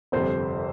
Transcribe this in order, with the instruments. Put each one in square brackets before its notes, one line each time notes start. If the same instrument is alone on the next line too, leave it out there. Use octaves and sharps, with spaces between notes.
[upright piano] G1 F2 C3 C5